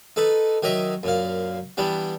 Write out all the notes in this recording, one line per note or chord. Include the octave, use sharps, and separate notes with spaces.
D#4 A4 B4
D#3 F#3 D#5 E5
F#2 A#2 F5
E3 G3 B3 D4